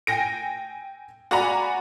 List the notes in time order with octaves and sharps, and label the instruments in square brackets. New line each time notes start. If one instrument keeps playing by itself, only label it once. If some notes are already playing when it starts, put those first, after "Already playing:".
[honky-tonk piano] G5 G#5 A#6 D7
F#4 D5 F#5 G#5 A#5 B5